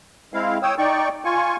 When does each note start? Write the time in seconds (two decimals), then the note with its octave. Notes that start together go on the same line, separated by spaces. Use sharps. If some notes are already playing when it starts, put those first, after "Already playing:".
0.34 G#3 C4 E4 F5
0.63 C#5 G5 D#6 E6
0.78 D#4 D5 G5 C#6
1.25 F4 G#5 C#6